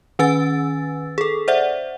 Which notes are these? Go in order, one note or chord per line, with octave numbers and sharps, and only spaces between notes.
D#3 C#4 B4 G#5 E6 A6
G#4 A4
C5 D5 E5 F#5